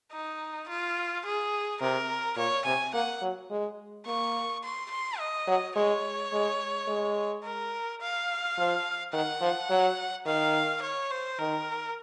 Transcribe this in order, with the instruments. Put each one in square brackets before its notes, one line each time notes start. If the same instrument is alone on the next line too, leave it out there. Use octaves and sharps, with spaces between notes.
[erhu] D#4
F4
G#4
[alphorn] C3 [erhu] A#4
[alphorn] A#2 [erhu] C#5
[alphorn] C3 [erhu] G#5
[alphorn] A#3 [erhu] F#5
[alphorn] F#3
G#3
[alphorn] A#3 [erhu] C#6
[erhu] C6
C6
D#5
[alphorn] F#3
[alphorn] G#3 [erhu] C#5
[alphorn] G#3
G#3
[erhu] A#4
F5
[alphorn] F3
[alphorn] D#3 [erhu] F#5
[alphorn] F3
F#3
[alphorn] D#3 [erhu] F5
[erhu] C#5
C5
[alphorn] D#3 [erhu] A#4